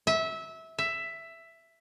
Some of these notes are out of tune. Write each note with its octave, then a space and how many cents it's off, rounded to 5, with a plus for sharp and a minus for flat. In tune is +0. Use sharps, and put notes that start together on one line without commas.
E5 -20
E5 +10